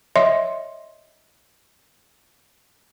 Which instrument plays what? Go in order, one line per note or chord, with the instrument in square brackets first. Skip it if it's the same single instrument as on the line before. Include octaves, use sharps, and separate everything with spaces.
[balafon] C#5 D#5 E5 C6